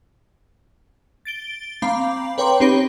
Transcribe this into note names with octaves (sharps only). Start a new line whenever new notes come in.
A6 D7 G7
C4 F5 A#5 B5 D6
B4 C#5 G5 A#5 C6 D6
C4 D#4 G4 C#5 B5 A#6